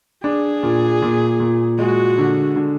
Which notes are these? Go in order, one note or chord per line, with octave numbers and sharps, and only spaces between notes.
D4 G#4
A#2
A#2
A#2
G#3 F#4
D3
D3